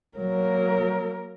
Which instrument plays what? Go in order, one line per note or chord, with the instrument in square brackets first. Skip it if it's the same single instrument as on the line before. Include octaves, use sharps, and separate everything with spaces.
[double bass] F#3 [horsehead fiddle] A#3 A#4